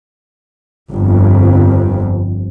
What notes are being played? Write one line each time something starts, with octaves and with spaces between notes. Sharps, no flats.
G1 F2